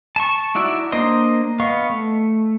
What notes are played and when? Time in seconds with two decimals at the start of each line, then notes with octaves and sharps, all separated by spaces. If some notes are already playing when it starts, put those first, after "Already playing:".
0.16 A5 C#6
0.55 D#4 E4 F#4 D5 E5
0.92 A#3 D4 C5 D#5 C6
1.60 B3 D#5 F5 C#6
1.90 A3